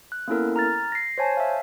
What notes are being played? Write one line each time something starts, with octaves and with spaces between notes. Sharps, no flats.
F#6
A#3 B3 C#4 E4 A4 A#4
A#5 F6 A6
A#6 C7
C5 C#5 G#5 A5
E5 F5